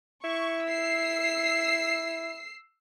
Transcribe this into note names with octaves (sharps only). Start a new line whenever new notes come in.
E4 C#6
E6 C7